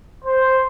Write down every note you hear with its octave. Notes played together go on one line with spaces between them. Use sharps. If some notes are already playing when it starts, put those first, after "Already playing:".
C5